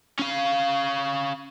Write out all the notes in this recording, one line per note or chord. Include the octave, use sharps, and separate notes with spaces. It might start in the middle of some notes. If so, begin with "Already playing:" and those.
C#4 F5